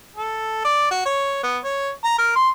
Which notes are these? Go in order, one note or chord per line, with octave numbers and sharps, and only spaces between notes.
A4
D5
F#4
C#5
B3
C#5
A#5
A#4
C6